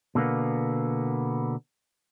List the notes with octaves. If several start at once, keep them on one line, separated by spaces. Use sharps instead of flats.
B2 D3 A#3 B3